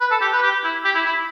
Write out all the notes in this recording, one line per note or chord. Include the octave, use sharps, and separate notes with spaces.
B4
A4
G4
B4
G4
E4
G4
E4
E4